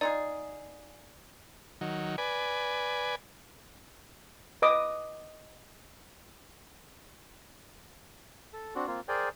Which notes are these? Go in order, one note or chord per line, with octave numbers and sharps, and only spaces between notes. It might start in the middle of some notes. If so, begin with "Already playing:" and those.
D#4 F4 G#4 D5
D#3 F#3
B4 D5 G#5
B4 D#5 D6 D#6
A4
C4 D4 F#4
A#3 C4 F4
G#4 A#4 C5 D5 G5 G#5